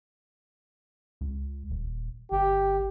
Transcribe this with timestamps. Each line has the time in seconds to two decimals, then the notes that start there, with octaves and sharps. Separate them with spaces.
1.21 C#2
1.70 D#1
2.32 G1 G4